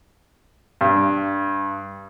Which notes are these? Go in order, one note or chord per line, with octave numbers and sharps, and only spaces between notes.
G2